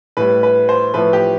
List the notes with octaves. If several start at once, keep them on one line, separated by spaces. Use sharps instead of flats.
A2 G3 B4
B4
C5
A2 F3 A3 B4
G4